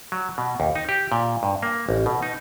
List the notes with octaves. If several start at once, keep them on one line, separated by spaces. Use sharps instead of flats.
F#3
B2
D#2
D#4
G4
A#2
G2
A#3
A1
B2
D#4